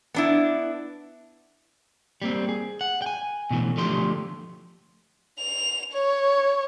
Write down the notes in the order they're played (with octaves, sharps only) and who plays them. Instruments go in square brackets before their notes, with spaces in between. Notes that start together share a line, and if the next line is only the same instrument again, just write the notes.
[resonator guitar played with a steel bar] B3 D4 E4
[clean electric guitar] G3 A#3 C4
G#4
F#5
G5 G#5
B2 E3 A3
D3 F3 A3 G4 C6
[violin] F7
C#5